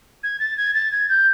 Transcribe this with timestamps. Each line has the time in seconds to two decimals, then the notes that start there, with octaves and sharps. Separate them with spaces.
0.23 G#6
0.40 A6
0.57 G#6
0.74 A6
0.92 G#6
1.09 G6